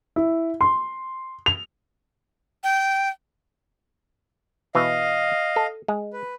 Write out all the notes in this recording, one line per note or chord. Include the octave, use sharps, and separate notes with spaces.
E4
C6
F7
G5
B2 E3 D#5 F5
A4
G#3
B4